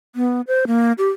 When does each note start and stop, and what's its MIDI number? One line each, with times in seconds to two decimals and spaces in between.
0.16 0.41 59
0.47 0.65 72
0.67 0.92 58
0.98 1.08 67